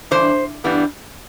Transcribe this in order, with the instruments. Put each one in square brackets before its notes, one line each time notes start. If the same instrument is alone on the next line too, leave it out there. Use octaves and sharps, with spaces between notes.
[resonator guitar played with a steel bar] G2 E3 D4 C5
G2 E3 G3 B3 D4